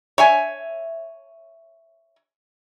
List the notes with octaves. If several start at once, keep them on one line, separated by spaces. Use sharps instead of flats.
C#5 E5 G#5